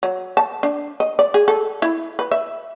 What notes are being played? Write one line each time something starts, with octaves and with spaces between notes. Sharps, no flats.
F#3
A5
D4
D#5
D5
G#4
A4
E4
B4
E5